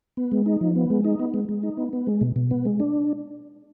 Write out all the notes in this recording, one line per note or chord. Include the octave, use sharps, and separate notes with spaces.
B3
G#3
D#4
F3
B3
G#3
D#4
B3
G#3
G#3
D#4
B3
B3
G#3
B2
B2
B3
G#3
D4